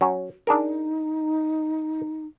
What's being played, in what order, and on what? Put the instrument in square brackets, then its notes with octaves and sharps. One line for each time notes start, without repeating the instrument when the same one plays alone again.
[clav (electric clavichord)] F#3 C#4
[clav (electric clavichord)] D4 G#4 A#4 [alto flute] D#4